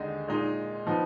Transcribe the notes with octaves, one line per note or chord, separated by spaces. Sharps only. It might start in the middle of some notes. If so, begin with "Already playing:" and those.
Already playing: D#2 D3 G#3 D#4
A#2 G#3 D#4
F3 B3 D#4